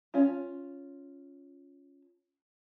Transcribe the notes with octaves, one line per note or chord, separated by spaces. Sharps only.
C#4 F4